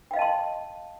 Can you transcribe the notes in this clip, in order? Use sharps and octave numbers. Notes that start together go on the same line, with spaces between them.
D#5 F5 G5 A5 C6